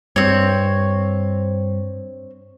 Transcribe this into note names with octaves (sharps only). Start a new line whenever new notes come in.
G2 C4 C#5